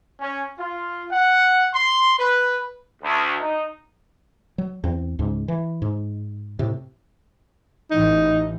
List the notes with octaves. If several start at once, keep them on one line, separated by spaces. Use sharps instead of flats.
C#4
F4
F#5
C6
B4
D2
D#4
F#3
E2 C4
C#2 G#2
E3
G#2
A2 C3
A1 E3 D#4